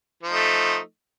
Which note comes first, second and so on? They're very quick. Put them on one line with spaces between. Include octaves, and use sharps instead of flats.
F3 D#4 A3